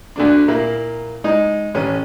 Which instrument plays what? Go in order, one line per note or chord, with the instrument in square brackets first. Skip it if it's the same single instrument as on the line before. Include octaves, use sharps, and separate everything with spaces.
[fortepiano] D2 D3 D4
A#2 A#3 E4
G#3 D#4
A1 C#4